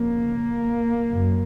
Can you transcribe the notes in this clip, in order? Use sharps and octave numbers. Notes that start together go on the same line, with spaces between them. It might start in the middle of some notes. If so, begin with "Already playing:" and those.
Already playing: F2 C#3 A#3
F#2 C#3